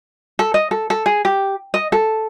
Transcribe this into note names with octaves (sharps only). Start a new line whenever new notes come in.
A4
D#5
A4
A4
G#4
G4
D#5
A4